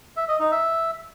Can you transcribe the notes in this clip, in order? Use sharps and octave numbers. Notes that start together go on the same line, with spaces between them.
E5
D#5
D#4
E5